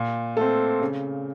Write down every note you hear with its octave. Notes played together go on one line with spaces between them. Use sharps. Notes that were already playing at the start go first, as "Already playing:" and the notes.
Already playing: A#2
A3 C4 A4
C#3